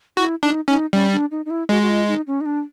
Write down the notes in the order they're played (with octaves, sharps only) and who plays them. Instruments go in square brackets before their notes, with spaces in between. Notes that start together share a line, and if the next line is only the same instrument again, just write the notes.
[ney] E4 [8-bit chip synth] F#4
[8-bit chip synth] D4 [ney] D#4
[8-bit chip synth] C#4 [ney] D#4
[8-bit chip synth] G3 [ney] C#4
[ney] D4
D#4
D#4
E4
[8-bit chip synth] G#3 [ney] F#4
[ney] F#4
F4
D#4
C#4
D#4
D4